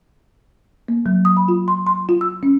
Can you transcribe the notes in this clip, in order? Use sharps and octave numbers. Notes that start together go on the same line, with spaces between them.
A#3
F#3
D#6
B5
F4
C6
C6
F4
E6
C#4